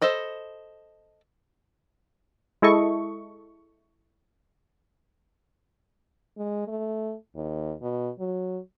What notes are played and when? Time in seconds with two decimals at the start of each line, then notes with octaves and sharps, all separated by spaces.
0.02 A4 C5 D#5 B5
2.62 G#3 E4 A4 D#5 C#6
6.38 G#3
6.68 A3
7.35 D#2
7.82 B2
8.19 F#3